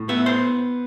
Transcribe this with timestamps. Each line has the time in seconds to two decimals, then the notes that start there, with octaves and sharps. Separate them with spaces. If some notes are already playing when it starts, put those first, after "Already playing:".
Already playing: A2
0.09 B3 E5
0.26 C5